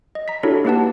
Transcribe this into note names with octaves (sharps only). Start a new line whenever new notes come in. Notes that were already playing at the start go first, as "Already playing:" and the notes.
D#5
A#5 B6
D4 E4 F#4 G4 A4 C#5
A#3 D#4 G4 B4 F#5 A5